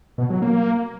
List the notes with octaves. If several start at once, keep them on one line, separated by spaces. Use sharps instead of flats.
B2
F#3
A#3